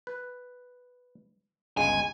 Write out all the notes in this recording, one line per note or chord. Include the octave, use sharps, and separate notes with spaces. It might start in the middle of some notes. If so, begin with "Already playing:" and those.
B4
G1 C#2 G#3 G#5